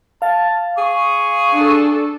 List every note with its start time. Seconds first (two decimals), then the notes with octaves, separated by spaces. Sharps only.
0.22 F5 A5
0.78 G#4 C#6
1.53 D4 A4